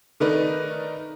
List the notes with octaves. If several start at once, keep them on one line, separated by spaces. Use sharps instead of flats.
D#3 A3 D#4 A#4 B4 D5